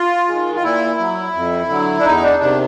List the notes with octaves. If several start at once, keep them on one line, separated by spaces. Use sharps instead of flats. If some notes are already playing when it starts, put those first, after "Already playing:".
Already playing: F4
D#3 G#3
F4
A#2 E4
F#3
F2
D3 F#3
D4
E2 D#4
D4
C3 D#3 D4